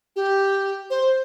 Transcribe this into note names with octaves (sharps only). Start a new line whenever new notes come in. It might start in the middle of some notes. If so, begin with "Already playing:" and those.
G4
C5